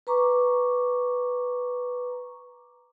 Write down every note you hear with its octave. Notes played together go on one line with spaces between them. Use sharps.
B4 A#5 C#6 D6